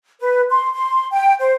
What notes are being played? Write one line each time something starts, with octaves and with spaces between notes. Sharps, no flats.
B4
C6
C6
G5
C5